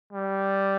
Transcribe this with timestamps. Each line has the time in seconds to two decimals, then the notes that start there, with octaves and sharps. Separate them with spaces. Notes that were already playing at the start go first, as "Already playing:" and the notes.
0.13 G3